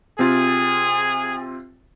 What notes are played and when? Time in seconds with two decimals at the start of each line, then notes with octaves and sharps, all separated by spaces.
0.19 C3 C4 F4 G#4